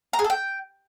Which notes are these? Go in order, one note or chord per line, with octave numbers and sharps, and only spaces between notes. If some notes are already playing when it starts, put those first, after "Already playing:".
A#5
G#4
A4
G5